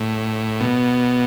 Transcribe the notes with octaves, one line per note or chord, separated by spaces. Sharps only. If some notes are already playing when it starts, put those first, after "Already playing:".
Already playing: A2
B2